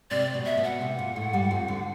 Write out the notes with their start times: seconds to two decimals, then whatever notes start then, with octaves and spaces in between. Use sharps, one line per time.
0.11 C3 C4 D5
0.34 B2 B3
0.46 E5
0.58 B2 B3
0.64 F#5
0.81 C3 C4
0.99 A#2 A#3
1.16 A2 A3
1.33 G2 G3
1.51 F2 F3
1.68 D2 D3